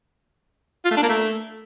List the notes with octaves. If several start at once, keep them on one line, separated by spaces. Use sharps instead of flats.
F4
A3
D4
A#3
A3